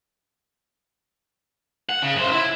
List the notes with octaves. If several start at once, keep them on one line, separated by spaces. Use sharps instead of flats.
F#5
C#3
F#2 C5
E4 E5